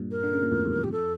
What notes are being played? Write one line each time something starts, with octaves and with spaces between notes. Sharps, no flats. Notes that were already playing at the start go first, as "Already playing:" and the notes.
Already playing: G2 A#2
A#4
D3
C#3
A#2
F2 A2
E2 G2
F2
G4
A4